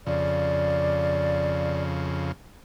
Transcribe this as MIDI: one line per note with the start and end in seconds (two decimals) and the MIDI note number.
0.07 2.32 41
0.07 2.32 49
0.07 1.82 74